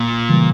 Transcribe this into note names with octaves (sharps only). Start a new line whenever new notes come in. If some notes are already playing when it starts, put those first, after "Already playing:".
Already playing: A#2
C#3 E3 G3 A#3